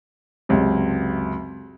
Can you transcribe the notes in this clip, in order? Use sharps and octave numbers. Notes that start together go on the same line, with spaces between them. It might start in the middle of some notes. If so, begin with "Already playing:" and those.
C#2 F#2 C3